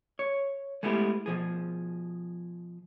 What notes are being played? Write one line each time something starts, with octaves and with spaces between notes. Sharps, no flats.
C#5
G#3 A3 B3 E4 G4
B2 F3 G#4